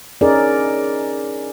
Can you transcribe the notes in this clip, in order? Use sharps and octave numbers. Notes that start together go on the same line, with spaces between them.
C#4 D#4 G#4 A#4 D5